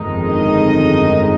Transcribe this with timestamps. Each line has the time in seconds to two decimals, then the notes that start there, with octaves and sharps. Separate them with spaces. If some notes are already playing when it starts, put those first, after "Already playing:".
Already playing: G1 F2 D#3 G#3 D#4
0.29 D#5